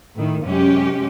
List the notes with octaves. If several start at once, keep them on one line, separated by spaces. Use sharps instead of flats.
A2 D#3
F#2 C3 G#3 C#4 G4